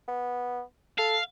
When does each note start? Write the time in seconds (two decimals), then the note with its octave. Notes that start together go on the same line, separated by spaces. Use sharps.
0.08 B3
0.98 A4 F5